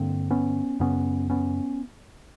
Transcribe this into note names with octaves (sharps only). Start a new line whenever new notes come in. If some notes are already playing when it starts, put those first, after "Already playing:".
Already playing: G2 D3 A#3 C4
B3 C#4
F#2 C#3 B3 C#4
B3 C#4